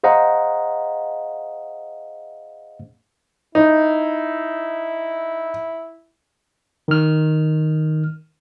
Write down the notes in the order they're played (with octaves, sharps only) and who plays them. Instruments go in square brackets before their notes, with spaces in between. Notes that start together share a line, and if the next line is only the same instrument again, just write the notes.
[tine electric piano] G#4 C5 D#5 F5 F#5 A#5
[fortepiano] D#4 [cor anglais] E4
[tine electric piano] D#3 F6